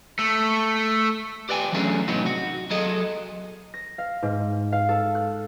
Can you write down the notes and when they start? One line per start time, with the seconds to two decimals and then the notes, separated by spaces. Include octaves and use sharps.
0.19 A3
1.49 G4 B4 D5 G5 G#5
1.72 E3 F#3 A3 C#4 D4 G#4
2.08 A2 C3 F#3 B3 D#4
2.26 F#4
2.70 F#3 G#4 A4 D#5
3.74 A#6
3.98 F5
4.23 G#2
4.72 F5
4.89 A4
5.15 F#6